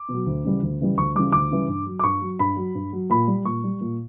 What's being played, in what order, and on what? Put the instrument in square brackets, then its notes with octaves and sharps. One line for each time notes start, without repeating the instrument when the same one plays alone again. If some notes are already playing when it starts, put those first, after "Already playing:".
Already playing: [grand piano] D6
B2
F#3
D2
C#3 E3 G3
D2
C#3 E3 G3
D2 C#6
C#3 E3 G3 D6
D2 D6
C#3 E3 G3
G2
F#3
D6
G2 C#6
F#3
G2 B5
F#3
G2
F#3
A#2 B5
G3
A#2 C#6
G3
A#2